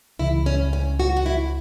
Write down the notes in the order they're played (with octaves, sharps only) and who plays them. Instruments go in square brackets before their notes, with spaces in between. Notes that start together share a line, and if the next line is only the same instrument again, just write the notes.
[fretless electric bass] C#2 C#3 E3 [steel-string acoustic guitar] E4
[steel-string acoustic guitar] C#4
C#4
F#4
F#4
E4